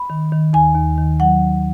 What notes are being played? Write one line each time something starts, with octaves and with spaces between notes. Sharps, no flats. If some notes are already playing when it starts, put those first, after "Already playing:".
Already playing: B5
D#3
D#3
D#2 G#5
D#2
D#3
F#3 F#5